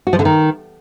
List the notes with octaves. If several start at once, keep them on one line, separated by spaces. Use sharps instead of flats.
F#4
F3
D3
D#3